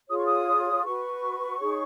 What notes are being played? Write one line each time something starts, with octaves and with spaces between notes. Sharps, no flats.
F4 G#4 C#5 D#6
C#6
D#6
F#4 B4 C#6
D#4 G#4 C#5